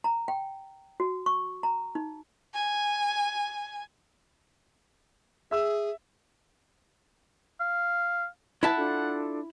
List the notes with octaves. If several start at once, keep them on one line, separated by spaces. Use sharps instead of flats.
A#5
G5
F#4
C#6
A#5
D#4
G#5
G#4 E5 E6
F5
E4 B4 E5 F#5 A5
D4 F4 A4